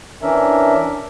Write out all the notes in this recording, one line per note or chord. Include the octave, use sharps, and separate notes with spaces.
E3 C#4 D4 A#4 E5